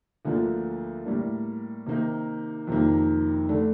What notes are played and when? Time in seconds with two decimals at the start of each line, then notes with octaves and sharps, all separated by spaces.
0.25 D2 D3 F3 A#3 F4
1.05 A2 G3 A#3 D4
1.86 C3 D#3 A#3 D#4
2.67 F2 C3 D#3 G3 A#3
3.49 D3 A3 D4